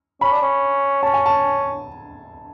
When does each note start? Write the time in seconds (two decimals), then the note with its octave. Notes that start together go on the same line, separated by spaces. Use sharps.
0.21 C#4 B5
0.32 D4
0.42 C#4
1.03 C#4 A5
1.14 G#5
1.26 A5